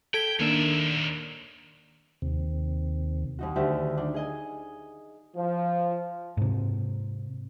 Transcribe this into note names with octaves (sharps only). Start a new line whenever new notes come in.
A4 G5 G#6 B6
D#2 D#3 A#3 D4 E5
D#2 C3
D#2 D#4 F#4
D2 D3 D#3 G4 E5
D4 D#4
G#4 D#5 G#5
F3
G#2 C3